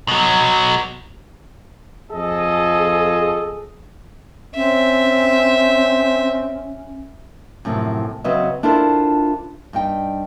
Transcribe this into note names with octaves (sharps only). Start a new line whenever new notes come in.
B2 F#3
F2 F3 G#4 A4 D#5
C4 C#4 E5
F#2 A2 C3 F3
C#3 F#3 C4 B4 D#5 E5
D4 E4 F4 A4 A#4 C5
G2 D#4 G5